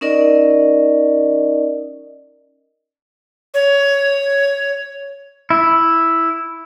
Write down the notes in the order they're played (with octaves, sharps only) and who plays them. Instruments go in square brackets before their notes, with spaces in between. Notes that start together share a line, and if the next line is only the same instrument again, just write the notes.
[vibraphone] C#4 D#4 A#4 D5 D#5
[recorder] C#5
[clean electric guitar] E4